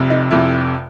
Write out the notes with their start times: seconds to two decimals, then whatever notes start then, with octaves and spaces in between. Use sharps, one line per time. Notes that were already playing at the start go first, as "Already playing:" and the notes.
Already playing: F1 F2 C3
0.10 D#4
0.31 F1 F2 C3 E4